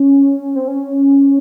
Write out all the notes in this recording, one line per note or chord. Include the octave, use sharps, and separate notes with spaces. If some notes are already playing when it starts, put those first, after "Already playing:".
Already playing: C#4
C4
C#4